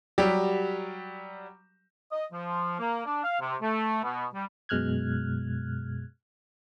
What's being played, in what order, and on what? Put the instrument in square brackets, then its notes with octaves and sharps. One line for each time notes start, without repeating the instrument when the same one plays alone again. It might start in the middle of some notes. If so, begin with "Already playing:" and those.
[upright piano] F#3 G3 G4
[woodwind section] D#5
F3
A#3
D4
F5
C3
A3
B2
G3
[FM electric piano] F#2 B2 G#3 F6 F#6 G#6